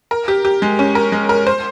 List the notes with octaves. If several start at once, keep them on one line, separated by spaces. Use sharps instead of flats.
A#4
G4
G4
G#3
C#4
A#4
G#3
A#4
C5